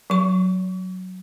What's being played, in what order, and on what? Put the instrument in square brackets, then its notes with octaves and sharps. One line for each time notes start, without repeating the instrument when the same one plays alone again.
[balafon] F#3 C#6